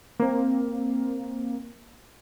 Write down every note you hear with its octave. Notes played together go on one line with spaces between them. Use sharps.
A#3 C4